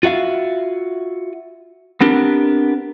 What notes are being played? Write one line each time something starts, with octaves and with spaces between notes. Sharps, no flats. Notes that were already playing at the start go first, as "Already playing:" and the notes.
F4 F#4 E5 F5
B3 C4 D4 G4 A#4